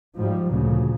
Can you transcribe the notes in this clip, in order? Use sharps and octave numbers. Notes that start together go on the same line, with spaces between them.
G#2 F3 G3
D2 A#2 C#3 F3